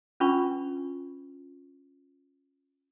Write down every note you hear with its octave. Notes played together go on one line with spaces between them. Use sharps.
C#4 D4 F4 B4 B5 C#6